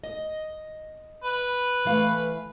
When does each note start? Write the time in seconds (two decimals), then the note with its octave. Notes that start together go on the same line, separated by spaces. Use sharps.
0.04 D#5
1.24 B4
1.85 E3 A3 F5